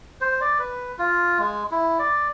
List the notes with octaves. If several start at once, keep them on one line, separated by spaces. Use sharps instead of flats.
C5
D5
B4
F4
G#3
E4
D5